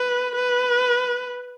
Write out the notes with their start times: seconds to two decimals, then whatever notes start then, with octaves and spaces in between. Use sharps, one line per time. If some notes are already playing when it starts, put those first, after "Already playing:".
Already playing: B4
0.36 B4